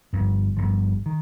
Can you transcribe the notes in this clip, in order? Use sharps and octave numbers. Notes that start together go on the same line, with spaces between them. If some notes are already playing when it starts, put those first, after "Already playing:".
G1 G2 F3
G1 G2 F3
D#3